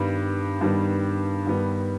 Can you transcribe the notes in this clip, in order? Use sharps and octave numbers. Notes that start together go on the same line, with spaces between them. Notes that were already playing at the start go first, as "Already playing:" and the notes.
Already playing: G2 D#3 G3 B3
G2 D#3 G3 B3
G2 D#3 G3 B3